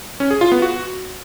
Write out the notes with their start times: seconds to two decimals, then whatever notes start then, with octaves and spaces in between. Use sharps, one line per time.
0.20 C#4
0.31 G#4
0.41 F4
0.52 B3
0.62 F#4